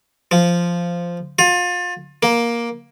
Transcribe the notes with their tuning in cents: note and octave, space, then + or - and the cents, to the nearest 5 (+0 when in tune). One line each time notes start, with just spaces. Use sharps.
F3 -10
F4 +30
A#3 +10